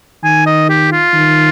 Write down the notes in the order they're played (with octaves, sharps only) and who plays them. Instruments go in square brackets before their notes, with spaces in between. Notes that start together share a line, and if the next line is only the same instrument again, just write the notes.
[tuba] D#3 [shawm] G#5
[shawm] D#5
G4
F4
[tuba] D#3